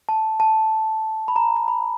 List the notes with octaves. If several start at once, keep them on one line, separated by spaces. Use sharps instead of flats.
A5
A5
B5
A#5
A#5
B5